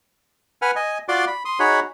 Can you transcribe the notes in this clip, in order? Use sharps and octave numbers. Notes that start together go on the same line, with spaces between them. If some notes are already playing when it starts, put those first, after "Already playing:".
B4 F#5 G#5 F6
D#5 G#5
F4 F#4 D5 C6 D6
B5
C6 D#6
D#4 F#4 G#4 C#5 F#5 B5